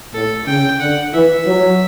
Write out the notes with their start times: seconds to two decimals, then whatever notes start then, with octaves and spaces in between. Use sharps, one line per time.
0.13 A2 A4
0.46 C#3 G5
0.80 D3 F#5
1.13 E3 E5
1.47 F#3